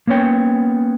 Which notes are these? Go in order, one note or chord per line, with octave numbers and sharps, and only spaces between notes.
A#3 B3 C#4 C#5 G5